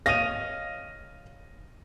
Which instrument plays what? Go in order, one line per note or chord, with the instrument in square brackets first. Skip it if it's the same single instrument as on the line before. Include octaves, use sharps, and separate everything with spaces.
[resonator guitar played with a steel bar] C#5 D#5 F5 [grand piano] A#6 D#7